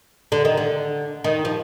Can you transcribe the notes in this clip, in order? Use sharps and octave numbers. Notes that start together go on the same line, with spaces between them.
D3
D#3
D3
D#3
F3